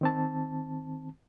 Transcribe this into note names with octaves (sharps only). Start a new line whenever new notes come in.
D#3 C4 A5